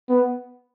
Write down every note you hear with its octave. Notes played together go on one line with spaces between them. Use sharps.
B3